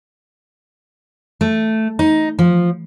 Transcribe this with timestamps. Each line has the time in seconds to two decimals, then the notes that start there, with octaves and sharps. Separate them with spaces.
1.41 A3
1.99 D#4
2.39 F3